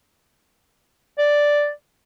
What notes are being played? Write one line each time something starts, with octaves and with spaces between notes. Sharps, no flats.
D5